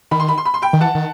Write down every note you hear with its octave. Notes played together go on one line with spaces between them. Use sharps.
D#3 B5
C6
B5
C6
B5
C6
G5 B5
D#3
E3 F#5 A5
D#3